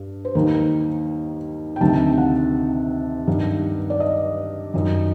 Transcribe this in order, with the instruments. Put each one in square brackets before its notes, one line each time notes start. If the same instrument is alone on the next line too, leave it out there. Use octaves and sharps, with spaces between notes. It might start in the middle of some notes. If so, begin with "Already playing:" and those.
Already playing: [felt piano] G2
C5
D#2 D#3 A#4
G5
D2 C3 D#3 A5
F#5
G2 D#3
D5
D#5
F#2 D#3